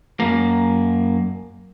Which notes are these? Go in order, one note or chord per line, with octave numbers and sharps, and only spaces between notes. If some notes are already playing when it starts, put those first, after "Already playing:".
F#2 A#3